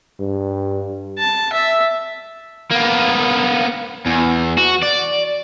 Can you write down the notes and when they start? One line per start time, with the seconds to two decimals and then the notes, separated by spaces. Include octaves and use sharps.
0.20 G2
1.19 A5
1.53 E5
2.71 A#3 B3
4.06 E2
4.58 F#4
4.83 D5